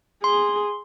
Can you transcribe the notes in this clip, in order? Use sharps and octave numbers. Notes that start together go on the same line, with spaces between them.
G#4 C6